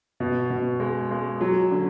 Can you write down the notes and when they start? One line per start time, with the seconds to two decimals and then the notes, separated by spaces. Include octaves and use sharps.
0.20 B2
0.50 B2
0.80 G#3
1.11 G#3
1.41 F#3
1.71 D3